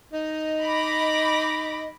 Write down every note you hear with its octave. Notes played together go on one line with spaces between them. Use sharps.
D#4 D#5
B5 D6 A#6